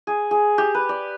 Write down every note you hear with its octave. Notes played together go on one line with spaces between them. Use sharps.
G#4
G#4
G4
B4
D5